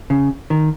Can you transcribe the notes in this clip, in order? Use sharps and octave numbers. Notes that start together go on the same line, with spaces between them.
C#3
D#3